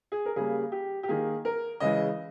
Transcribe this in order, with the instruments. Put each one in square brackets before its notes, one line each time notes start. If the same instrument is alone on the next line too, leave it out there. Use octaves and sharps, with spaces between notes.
[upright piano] G#4
A#4
C#3 G3 A#3 G#4
G4
G4
D#3 A#3 G#4
A#4
C#3 E3 G#3 D#5